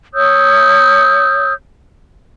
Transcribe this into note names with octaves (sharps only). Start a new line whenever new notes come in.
C#5 D#6 E6 G6